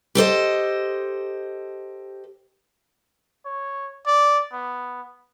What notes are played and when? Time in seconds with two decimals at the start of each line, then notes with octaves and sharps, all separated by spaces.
0.15 G4 A4 C5 D#5
3.45 C#5
4.07 D5
4.52 B3